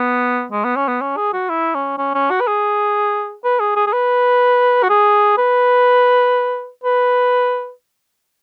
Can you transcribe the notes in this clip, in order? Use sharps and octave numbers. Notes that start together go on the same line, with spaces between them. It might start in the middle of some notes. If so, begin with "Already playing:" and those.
Already playing: B3
G#3
B3
C#4
B3
C#4
G#4
F#4
E4
C#4
C#4
C#4
F#4
B4
G#4
B4
G#4
G#4
G#4
B4
F#4
G#4
B4
B4